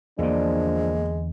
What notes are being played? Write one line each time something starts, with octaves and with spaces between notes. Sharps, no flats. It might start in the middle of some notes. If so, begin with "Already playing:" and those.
E2 D3 F3 G#3 A#3 D4